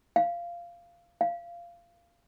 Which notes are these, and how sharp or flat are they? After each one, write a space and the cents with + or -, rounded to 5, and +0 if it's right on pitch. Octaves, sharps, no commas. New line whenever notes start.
F5 -15
F5 -20